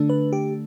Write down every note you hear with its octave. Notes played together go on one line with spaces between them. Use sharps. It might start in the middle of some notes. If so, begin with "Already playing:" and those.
Already playing: D3 A3 D4
B4
G4